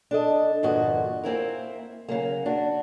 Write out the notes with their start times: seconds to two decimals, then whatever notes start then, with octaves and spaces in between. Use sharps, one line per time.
0.11 D4 A4 D#5
0.63 E2 G2 A#2 D3 F#4 D#5
1.23 A#3 C4 E4 A#4
2.08 C#3 F#3 A#3
2.46 D4 F#4